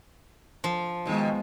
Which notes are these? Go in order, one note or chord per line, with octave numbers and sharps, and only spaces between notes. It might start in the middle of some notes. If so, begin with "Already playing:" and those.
F3
B2 D#3 G#3 B3